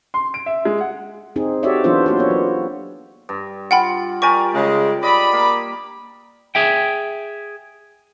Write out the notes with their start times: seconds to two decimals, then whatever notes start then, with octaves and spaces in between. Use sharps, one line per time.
0.14 C6
0.34 D7
0.46 E5
0.65 G#3
0.81 F#5
1.36 C4 D#4 G#4
1.63 F#4 G4 A4 C#5 D5 E5
1.84 E3 F#3 B3 D4 F4 C5
2.06 A#3 F#4 C5
2.18 B3 C#5
2.30 F#3
3.29 G2
3.71 F4 F#5 G5 B5
4.22 G4 A#4 D5 G#5 C#6
4.54 C#3 G#3
5.03 D5 D#5 B5
5.33 A#3
6.55 G#4 E5 G5